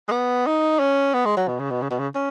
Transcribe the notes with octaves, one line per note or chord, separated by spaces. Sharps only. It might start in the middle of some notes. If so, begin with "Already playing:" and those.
G#3
B3
D#4
C#4
B3
G#3
F#3
B2
C#3
B2
C#3
B2
C#3
C#4